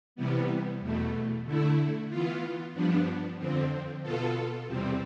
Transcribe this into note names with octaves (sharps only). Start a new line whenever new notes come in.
C3 E3 G3 B3
E2 B2 A3
D3 A3 E4
E3 B3 F4
G2 F3 B3 D4
F2 D3 F3 C4
B2 B3 F4 A4
E2 C3 G3 C4